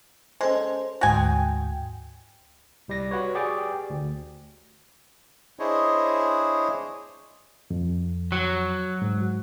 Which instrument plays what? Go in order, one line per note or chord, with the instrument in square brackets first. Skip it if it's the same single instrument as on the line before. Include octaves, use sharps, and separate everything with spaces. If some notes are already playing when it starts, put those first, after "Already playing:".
[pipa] G#3 [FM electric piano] C#4 A4 C5
[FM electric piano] D2 G#2 G5 [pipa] F#4 G#5
[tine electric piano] C2 G3 D5 A#6
F#4 B4 C#5
G4 G#4 D5 G5
D2
[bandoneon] D4 E4 G#4 C5 C#5 D#5
[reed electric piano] F2
[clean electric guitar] F#3
[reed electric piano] G#2